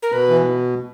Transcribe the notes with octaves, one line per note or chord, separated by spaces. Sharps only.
A#4
B2 B4
E3